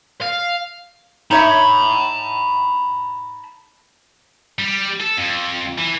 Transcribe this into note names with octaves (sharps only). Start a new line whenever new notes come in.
F5
D#4 C#5 E5 A5 B5
G3
A4
F2
E3